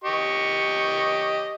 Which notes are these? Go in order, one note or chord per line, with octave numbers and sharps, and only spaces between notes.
G4 D#5 C#6